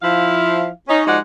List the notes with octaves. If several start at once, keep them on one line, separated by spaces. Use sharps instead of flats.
F3 E4 F5
C#4 D#4
F3 G#3 D#4 F#4 D5 F#5